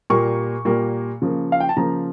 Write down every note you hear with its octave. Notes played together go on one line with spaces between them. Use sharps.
A#2 G3 A#3 C#6
A#2 G3 A#3
C#3 F3 A#3
F5
G5
A5
C#3 F3 A#3 A#5